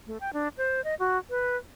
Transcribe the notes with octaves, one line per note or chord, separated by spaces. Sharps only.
A3
G5
D4
C5
D#5
F#4
B4